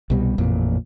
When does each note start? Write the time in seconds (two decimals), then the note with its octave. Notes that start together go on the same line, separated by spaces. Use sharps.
0.10 C2 B2 G3
0.38 A1 F2 A#2